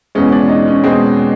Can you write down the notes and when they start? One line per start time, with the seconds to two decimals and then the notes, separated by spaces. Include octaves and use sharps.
0.15 E2 B2 G#3 C#4
0.32 D4
0.49 D#4
0.67 C#4
0.84 B2 G#3 C4